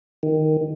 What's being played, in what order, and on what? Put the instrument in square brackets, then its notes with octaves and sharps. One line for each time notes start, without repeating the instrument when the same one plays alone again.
[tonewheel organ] D#3